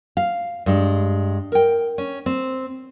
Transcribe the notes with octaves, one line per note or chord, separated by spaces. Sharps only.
F5
G2 G#3
A#4 G5
C#4
C4